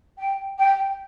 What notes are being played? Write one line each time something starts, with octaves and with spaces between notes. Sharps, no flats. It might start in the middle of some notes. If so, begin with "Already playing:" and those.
G5
G5